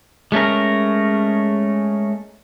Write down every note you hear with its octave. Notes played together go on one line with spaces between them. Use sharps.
G#3 A3 C#4 A#4